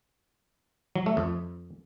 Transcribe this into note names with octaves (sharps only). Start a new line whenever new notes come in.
F#3
A3
F2